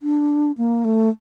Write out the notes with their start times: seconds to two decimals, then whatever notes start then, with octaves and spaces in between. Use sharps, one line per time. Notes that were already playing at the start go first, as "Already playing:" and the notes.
0.03 D4
0.58 A#3
0.85 A3